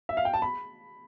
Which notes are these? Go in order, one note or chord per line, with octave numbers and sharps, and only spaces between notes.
E5
F5
G5
A5
B5